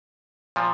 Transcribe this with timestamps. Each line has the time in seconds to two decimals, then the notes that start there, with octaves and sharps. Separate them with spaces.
0.56 A#2 F3